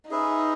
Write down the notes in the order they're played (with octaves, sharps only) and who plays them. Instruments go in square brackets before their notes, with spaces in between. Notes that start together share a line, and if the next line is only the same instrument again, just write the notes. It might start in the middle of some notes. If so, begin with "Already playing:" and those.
[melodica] C#4 G#4 B4 E5 [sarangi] D#4